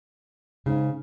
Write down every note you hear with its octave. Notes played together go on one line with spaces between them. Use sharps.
G#2 C#3